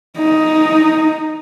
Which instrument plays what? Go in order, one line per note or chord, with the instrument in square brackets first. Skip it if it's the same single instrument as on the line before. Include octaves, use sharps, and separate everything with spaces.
[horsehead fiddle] D#4